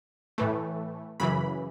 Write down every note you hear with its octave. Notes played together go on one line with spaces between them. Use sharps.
A2 E3 A3
F#2 C#3 E3 B5